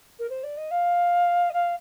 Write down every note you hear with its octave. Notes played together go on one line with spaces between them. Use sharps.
A#4
C5
D5
D#5
F5
D#5
F5